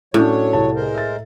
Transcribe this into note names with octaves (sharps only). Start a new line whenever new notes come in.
A2 F#3 C#4 D4 C#5
C2 A5
G#3 A#4 C5
E5 A6